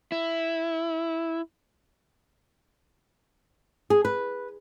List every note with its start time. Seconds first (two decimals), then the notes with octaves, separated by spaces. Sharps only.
0.12 E4
3.90 G#4
4.05 B4